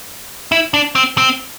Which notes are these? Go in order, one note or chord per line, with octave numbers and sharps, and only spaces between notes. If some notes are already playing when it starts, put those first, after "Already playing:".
E4
D4
C4
C4